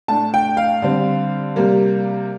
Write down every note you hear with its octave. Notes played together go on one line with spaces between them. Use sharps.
A2 A3 D4 A5
G5
F5
D3 G3 C4
C3 G3 A#3